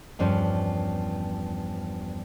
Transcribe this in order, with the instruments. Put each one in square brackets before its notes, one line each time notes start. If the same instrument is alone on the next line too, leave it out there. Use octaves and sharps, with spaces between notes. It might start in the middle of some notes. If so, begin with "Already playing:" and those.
[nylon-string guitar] E2 G2 F3 C#4